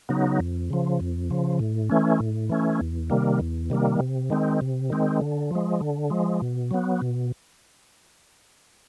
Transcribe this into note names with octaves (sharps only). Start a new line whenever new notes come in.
C#3 F#3 B3 D#4
F2
C#3 F3
F2
C#3 F3
A2
E3 A3 C#4
A2
E3 A3 C#4
E2
C3 D#3 G3 A#3
E2
C3 D#3 G3 A#3
C3
D#3 G#3 C4
C3
D#3 G#3 C4
D3
F3 G#3
D3
F3 G#3
B2
F#3 B3
B2